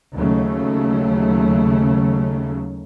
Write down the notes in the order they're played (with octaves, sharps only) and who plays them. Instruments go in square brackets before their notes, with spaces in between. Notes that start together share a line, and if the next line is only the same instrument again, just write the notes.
[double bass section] D#2 C#3 F#3 A3